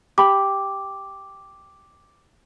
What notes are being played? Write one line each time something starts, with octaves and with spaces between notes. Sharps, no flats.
G4 B5 D6